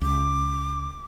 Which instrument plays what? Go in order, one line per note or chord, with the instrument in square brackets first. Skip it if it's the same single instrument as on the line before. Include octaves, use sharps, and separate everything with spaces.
[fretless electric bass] C#2 [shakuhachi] D6